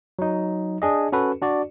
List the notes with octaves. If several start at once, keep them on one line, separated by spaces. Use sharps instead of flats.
F#3 D#4
D4 G#4 D#5
C#4 F#4 A4 B4
D4 F#4 D5